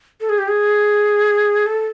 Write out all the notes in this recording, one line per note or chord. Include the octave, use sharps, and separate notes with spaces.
A4
G#4
G4
G#4
A4